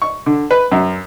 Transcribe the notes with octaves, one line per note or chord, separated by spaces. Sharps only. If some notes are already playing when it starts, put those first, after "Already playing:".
C#6
D3
B4
F#2